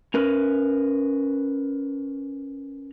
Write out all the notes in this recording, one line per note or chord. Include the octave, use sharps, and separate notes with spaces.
C#4 A#4 B4